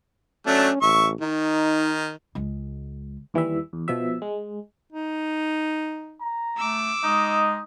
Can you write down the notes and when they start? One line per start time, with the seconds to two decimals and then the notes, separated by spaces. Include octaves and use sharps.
0.47 F#3 A3 C#4 D4
0.82 A1 E5 C#6
1.21 D#3 D#4
2.35 C#2 G#3
3.34 D#2 E3 G3 E5
3.73 E2
3.88 B2 F3 E5
4.22 G#3
4.92 D#4
6.21 A#5
6.58 A3 D6 E6
7.04 G#3 D#4 D#5